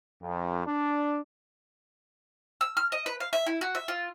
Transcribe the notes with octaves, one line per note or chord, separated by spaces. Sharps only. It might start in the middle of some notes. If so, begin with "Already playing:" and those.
F2
D4
E6
F6
D#5
B4
F5
E5
E4
F#4
E5
F4